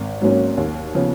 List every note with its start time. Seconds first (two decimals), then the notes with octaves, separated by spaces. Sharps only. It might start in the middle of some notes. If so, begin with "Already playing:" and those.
Already playing: G#1
0.22 G#2 F#3 A#3 C#4
0.57 D#2
0.95 C#3 F3 B3